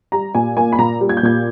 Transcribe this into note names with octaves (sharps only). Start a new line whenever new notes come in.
G3 A#5
A#2 G#5
A#3 G#5
B5
A#2 A#5
G3
G#6
G6
A#2 G#6